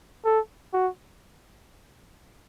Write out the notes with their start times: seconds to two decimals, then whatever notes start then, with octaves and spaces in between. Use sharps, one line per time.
0.25 A4
0.74 F#4